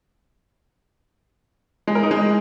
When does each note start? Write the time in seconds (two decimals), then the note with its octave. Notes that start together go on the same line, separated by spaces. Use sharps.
1.87 G#3
1.95 A#4
2.03 D#4
2.11 G#3